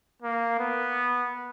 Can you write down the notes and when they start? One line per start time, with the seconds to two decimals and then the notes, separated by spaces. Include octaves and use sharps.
0.22 A#3
0.59 B3